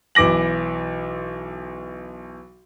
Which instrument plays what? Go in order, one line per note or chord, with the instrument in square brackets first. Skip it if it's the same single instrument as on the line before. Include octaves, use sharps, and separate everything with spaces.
[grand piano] B1 E3 D6 A#6 F#7